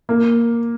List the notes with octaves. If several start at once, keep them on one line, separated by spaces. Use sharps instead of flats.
A#3